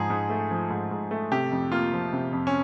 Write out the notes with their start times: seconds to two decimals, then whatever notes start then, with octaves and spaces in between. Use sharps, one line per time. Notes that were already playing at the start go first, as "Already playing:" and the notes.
Already playing: G#2 F3 G#4
0.10 G#2
0.30 A3
0.51 F3
0.70 G#2
0.91 G#2
1.11 A3
1.32 C3 G4
1.52 F2
1.72 A#3 F4
1.93 F3
2.13 C3
2.33 F2
2.47 C#4